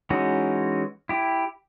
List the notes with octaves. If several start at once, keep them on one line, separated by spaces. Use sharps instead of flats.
E3 G#3 C#4 D#4 F#4
E4 G4